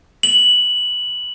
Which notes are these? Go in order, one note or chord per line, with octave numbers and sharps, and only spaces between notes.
F#7